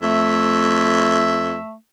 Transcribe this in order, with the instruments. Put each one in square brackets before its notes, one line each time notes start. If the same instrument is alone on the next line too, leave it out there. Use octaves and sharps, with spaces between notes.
[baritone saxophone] F2 [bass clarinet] A3 [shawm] E5